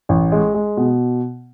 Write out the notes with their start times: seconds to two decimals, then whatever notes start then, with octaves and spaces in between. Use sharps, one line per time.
0.09 A1
0.32 G#3
0.54 G#3
0.77 B2